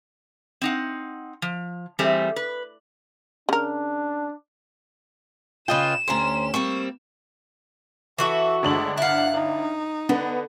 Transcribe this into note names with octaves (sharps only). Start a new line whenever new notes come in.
C4 D#4 F#5
F3
E3 G3 A3 C4 G#4 C5
B4
C#3 D4 A#4
C#3 F4 B4 D#5 G5 E7
D2 C#4 G4 C5 A#5
G3 A#3 C4 C#6
E3 F#4 A4 E5
G1 G#3 A3 D4 F#7
E4 F5 F#5 F#6
D#4
D3 B3